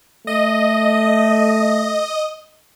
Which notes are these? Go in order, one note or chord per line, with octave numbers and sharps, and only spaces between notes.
A3 D#5